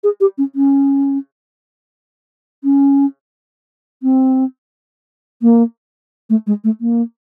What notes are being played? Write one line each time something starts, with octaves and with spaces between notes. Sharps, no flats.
G#4
G4
C#4
C#4
C#4
C4
A#3
A3
G#3
A3
A#3